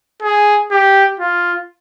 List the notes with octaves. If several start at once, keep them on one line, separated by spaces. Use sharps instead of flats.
G#4
G4
F4